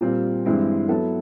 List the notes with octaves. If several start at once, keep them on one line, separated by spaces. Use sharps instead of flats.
A#2 G3 C4 F4
G2 E3 G#3 C4 E4
F#3 B3 E4 A4